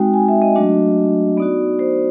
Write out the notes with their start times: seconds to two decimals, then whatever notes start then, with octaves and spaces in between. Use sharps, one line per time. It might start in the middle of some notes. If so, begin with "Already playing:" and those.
Already playing: G#3 C4 D#4 F#4 G5
0.14 G#5
0.28 E5
0.42 D#5
0.55 F#3 A3 D4 F#4
1.37 B3 D#4 F#4 D5
1.79 C5